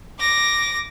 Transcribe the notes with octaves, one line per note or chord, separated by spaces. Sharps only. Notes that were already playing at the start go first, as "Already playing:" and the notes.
D6 A#6